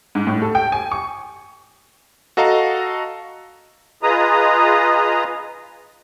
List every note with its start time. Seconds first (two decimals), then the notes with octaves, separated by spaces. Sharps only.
0.15 G#2
0.27 A2
0.42 A4
0.55 G5
0.72 G#5
0.92 C#6
2.37 F#4 A4 D#5 F5 A#5
4.03 F4 G#4 B4 D#5 A#5 D#6